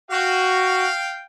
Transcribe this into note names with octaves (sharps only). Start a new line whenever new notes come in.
F#4 F5 G5